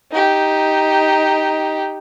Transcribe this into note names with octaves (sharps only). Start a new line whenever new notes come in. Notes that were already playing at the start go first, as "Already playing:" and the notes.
D#4 G4